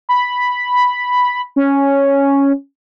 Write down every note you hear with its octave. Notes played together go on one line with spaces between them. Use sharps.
B5
C#4